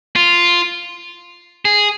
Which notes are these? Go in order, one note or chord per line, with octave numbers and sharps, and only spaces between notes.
F4
G#4